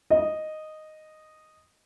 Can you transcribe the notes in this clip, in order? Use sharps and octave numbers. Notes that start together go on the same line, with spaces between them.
D#5